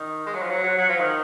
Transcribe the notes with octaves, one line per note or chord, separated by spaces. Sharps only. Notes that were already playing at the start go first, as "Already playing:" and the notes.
Already playing: D#3
G#3
F#3
F3
F#3
F#3
F#3
F3
D#3